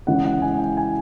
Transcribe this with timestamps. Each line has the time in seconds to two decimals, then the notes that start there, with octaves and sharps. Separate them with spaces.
0.07 C#3 E3 G#3 C#4 F#5
0.25 F#5
0.42 G#5
0.59 G5
0.77 G#5